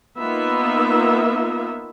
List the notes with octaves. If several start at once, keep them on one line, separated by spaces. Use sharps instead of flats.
A#3 B3 D#4 F4 E5